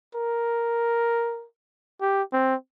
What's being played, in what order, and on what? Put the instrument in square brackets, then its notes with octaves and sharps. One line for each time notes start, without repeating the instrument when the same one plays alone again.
[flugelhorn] A#4
G4
C4